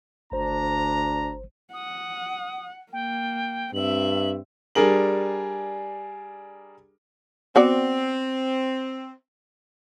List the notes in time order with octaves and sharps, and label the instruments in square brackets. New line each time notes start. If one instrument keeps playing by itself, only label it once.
[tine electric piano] G1 C5 [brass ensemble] D2 D4 A#5
[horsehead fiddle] F#5 [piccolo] D#6
[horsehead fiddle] A#3 [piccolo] G5
[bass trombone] G2 [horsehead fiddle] C4 E5 [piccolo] F#7
[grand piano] G3 D4 G#4 A#4 F#7
[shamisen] B3 F#4 D5 [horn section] C4